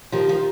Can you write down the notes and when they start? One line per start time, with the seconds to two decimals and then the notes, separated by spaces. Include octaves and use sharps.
0.12 D#3 F3 G4
0.29 D#3 F3